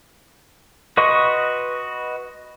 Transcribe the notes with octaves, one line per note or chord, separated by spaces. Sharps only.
F#4 B4 D#5 C6 C#6